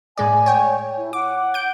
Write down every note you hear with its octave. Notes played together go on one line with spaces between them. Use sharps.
A2 G#3 D5 G#5
C#5 G5
E4
F#5 D6
G6 D7